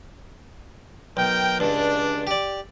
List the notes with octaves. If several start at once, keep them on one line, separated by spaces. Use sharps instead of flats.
B1 A#4 G5
C#2 G2 D4
G4 D5